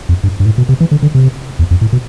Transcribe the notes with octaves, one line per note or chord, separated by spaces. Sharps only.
F2
G2
G2
A2
B2
C3
E3
D3
D3
C3
E2
F2
A2
B2